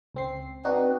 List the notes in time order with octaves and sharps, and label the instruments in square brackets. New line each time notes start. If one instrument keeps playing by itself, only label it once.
[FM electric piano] C#2 C4 C7
[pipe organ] C4 B4 [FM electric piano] D4 D#4 F#4